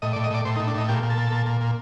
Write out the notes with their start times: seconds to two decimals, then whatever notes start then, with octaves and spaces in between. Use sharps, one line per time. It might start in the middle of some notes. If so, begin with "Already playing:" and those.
0.02 A2 D#5
0.13 D5
0.16 A2
0.24 D#5
0.30 A2 D5
0.45 A2 C5
0.56 D#4
0.60 A2
0.67 D4
0.75 A2 D#4
0.88 A#2 G4
1.03 A#2
1.10 A4
1.18 A#2
1.32 A#2
1.46 A#2
1.61 A#2